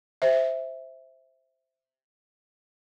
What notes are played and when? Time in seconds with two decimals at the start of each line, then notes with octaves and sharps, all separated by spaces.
0.22 C5 E5